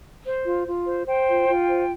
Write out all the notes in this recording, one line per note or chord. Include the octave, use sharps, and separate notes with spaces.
C5
F4
F4
C5
C5 G5
F4
F4
C5